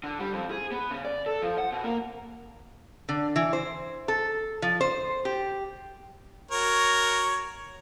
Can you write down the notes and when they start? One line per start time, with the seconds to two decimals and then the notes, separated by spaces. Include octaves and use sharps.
0.04 D3
0.19 G3
0.33 F2
0.51 G#4
0.72 B3
0.91 C#3
1.05 D5
1.26 A4
1.42 F3
1.58 F#5
1.72 B2
1.84 A#3
3.09 D3
3.36 E3
3.53 C5
4.08 A4
4.62 F3
4.81 C5
5.25 G4
6.51 F#4 A#4 C#5